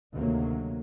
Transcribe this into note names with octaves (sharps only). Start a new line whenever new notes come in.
D2 C3 D#3 F#3 A#3